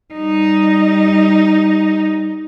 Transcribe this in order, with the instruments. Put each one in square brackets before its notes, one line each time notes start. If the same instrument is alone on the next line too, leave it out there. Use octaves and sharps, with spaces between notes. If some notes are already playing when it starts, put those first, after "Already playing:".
[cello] G3 D#4